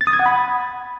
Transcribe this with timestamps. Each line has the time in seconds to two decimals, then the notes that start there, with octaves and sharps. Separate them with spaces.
0.01 A6
0.07 D#6
0.13 G#6
0.20 F#5
0.26 B5